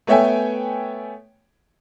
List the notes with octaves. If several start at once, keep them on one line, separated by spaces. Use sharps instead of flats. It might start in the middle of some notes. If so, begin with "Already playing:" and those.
A3 B3 C#5 E5 G5 G#5